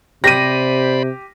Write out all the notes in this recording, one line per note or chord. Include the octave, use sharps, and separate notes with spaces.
C3 G4 C5 D5 B5 A#6 D#7